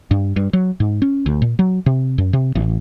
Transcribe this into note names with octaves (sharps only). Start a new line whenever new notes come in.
G2
G2
F#3
G#2
C#4
D2
A#2
F#3
C3
F#2
C3
A1